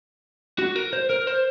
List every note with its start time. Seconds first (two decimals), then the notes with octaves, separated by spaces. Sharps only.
0.59 F#4
0.76 A#4
0.93 C5
1.10 A#4
1.27 C5